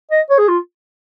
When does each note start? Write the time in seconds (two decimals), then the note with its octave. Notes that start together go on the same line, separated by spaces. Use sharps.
0.11 D#5
0.30 C#5
0.38 G#4
0.48 F4